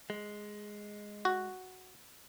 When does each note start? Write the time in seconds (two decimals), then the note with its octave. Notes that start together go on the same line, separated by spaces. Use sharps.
0.10 G#3
1.25 F#4